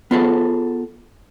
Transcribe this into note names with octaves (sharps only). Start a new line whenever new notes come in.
B3 F4 G#4 A4